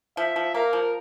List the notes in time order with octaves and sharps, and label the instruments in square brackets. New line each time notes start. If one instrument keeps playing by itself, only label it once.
[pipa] F3 [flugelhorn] E5
[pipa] F3
[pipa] A#3 [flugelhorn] A#4
[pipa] F3